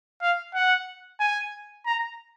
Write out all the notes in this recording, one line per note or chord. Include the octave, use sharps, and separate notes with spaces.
F5
F#5
G#5
A#5